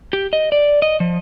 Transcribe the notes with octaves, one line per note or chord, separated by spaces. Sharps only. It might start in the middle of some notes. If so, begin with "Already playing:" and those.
G4
D#5
D5
D#5
F3